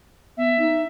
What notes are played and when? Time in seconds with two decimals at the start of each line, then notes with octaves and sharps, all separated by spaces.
0.37 B3 E5
0.59 D#4